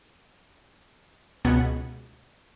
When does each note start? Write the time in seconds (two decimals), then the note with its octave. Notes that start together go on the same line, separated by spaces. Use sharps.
1.45 C#2 B2 B3 F#5 G#6